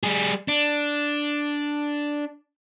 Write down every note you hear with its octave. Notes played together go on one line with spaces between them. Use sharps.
G3 G#4
D4